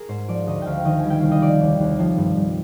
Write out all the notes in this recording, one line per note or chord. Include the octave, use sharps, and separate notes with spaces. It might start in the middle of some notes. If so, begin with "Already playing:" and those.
Already playing: G#4 A#4
G#2 C5
F3 D5
D2 D#5
D2 F5 G5
D#3 D#5
G#5
G3
G5
C2 F5
D#5
F3 D5
D#2
D#2
F3
G2
G2